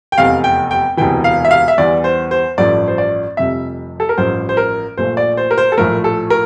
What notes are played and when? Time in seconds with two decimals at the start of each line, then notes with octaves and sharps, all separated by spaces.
0.12 G5
0.18 F1 E2 C3 F5
0.44 G5
0.71 G5
0.97 E1 D2 C3 E3 G5
1.24 F5
1.45 E5
1.51 F5
1.68 E5
1.78 E2 E3 G3 D5
2.04 C5
2.31 C5
2.58 A1 G2 F3 A3 D5
2.88 C5
2.98 D5
3.37 F1 F2 C3 G3 E5
4.00 A4
4.09 A#4
4.17 A1 G2 F3 C5
4.49 C5
4.57 A#4
4.97 A#1 A#2 A3 C5
5.17 D5
5.37 C5
5.51 A#4
5.58 C5
5.72 A4
5.78 A#1 A2 F3 A3 A#4
6.04 A4
6.30 A#4